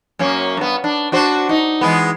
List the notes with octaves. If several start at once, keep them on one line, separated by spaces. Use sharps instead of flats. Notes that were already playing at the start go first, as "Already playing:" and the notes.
F#2 A#3 C#4
G2 B3
D4
D4 F#4 C5
D#4
E3 G#3 B3